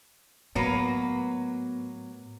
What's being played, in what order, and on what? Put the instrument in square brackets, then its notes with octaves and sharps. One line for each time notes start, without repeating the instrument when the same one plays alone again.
[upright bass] A2 [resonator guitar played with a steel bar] F#3 A#3 B4 [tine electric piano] B3